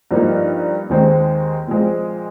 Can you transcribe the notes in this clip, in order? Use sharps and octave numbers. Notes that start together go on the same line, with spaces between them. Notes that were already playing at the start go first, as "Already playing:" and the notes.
G2 F3 A#3 D#4
D#2 D#3 G#3 C4
A#2 F3 G#3 C4